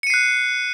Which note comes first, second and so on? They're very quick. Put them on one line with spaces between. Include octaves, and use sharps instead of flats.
C#7 D#7 C7 F#6